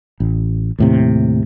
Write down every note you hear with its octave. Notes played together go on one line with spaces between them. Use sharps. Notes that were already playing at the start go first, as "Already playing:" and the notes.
A1
D#2 A2 C3